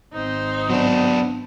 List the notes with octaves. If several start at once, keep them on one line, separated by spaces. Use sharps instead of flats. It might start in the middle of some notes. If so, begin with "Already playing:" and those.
G#1 C4 D#4 C5
F#3 B3 D4